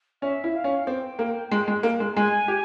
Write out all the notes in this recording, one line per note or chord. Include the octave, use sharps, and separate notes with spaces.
C#4 E5
E4
F5
C#4
C4 G5
A#3
G#3
G#3
A#3
G#3
G#3 G#5
G4